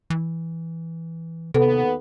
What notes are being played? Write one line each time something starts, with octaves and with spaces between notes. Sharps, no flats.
E3
D#2 C3 B3 A4